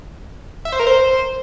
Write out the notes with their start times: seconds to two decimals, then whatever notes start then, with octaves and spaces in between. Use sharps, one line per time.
0.65 E5
0.72 C5
0.80 A#4
0.87 C5